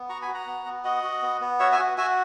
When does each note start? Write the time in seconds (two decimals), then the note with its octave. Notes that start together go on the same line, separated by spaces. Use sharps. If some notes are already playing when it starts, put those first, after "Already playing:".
Already playing: B3
0.09 F#4 A#5 C#6
0.22 G#5 B5
0.28 F#4
0.34 F#5 A#5
0.47 B3
0.66 B3
0.84 F#4 D#5 F#5
1.04 F#4
1.22 B3
1.41 B3
1.60 F#4 C#5 E5
1.72 E5 G#5
1.79 F#4
1.98 F#4 E5 G#5